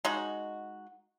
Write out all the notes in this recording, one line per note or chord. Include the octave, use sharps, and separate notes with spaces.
G#3 D#4 F#4